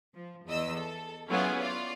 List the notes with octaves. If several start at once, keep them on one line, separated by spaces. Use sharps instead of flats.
F3
E2 D#5 E6
A4
F#3 B3 C#4 E4 F4 G#4
F4 D5